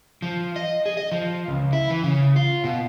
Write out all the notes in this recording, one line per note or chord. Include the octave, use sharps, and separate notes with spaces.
F3
D#5
G#4
D#5
F3
C#2
E4
E3
C#3
F4
B2